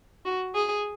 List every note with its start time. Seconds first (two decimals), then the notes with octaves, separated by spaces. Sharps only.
0.25 F#4
0.55 G#4